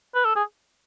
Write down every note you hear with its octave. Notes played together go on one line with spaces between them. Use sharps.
B4
A4
G#4